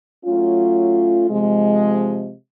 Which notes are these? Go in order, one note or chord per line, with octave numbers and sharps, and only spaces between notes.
F#3 A3 C#4 F4
C3 F3 G#3